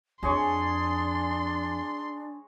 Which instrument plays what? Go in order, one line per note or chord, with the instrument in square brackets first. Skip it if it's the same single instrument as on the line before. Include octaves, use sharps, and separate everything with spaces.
[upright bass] F2 [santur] G#3 G#4 C#5 [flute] D4 [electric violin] C6